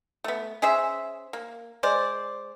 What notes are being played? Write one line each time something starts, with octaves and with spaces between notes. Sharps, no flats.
A3 B3
C#4 G#4 C5 E5
A#3
G#3 C5 D5